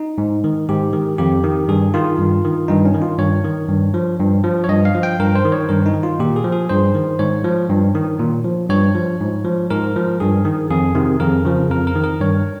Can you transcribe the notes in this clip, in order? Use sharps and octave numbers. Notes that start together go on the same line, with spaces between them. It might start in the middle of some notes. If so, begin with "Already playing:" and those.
Already playing: D#4
G#2
D#3
G#2 G4
D#3
F2 G4
D#3
G2 G#4
D#3 F4
G2
D#3
G2 D#4
C#4
D#3
F4
G2 C#5
D#3
G2
F3
G2
F3
C#5
G2 D#5
F5
F3
G5
G2 A#4
C5
D#3
C#5
G2 A#4
D#4
D#3
F4
A#2 G4
G#4
F3
G#4
G2 C5
D#3
G#2 C#5
F3
G2
D#3
A#2
F3
G2 C#5
F3
G#2
F3
G#2 A#4
F3
G2 G#4
D#3
F2 G#4
C3 D#3
F2 A#4
C#3 F3
F2 A#4
A#4
D#3
A#4
G2 C#5